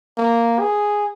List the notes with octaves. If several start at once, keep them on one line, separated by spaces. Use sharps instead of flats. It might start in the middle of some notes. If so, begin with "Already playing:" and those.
A#3
G#4